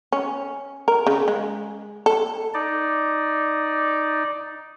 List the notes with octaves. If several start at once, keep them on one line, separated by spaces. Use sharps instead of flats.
C#4
A#4
C#3
G#3
A4
D#4 D5